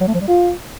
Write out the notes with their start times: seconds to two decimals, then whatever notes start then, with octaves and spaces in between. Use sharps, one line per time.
0.01 F#3
0.08 A3
0.14 F3
0.21 G3
0.28 F4